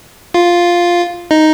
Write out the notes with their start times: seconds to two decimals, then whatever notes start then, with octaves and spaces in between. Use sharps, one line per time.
0.34 F4
1.31 D#4